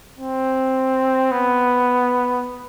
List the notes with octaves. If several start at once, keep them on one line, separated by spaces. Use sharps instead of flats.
C4
B3